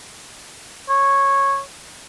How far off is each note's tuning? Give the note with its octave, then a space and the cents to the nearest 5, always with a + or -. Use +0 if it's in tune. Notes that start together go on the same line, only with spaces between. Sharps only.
C#5 -10